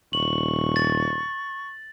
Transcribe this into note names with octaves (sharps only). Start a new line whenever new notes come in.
D#1 C#6 F#7
A6